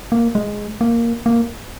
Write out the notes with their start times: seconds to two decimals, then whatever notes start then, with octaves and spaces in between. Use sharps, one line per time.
0.12 A#3
0.35 G#3
0.81 A#3
1.26 A#3